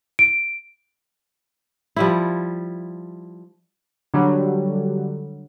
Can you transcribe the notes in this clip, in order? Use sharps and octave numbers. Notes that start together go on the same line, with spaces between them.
D7
F3 G3 E4
D3 F#3 G3